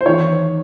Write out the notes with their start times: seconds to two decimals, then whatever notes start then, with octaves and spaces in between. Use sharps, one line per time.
0.01 C5
0.06 E2 D#3 C#5